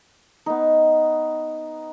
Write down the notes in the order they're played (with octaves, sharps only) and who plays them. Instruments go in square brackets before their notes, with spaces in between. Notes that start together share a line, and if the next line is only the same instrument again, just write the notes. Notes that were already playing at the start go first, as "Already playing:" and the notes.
[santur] B3 D#4